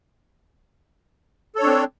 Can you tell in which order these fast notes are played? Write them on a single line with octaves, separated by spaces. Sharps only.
A4 C#5 D4 C4